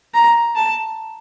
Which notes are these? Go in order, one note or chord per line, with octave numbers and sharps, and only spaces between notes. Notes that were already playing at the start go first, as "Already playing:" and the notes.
A#5
A5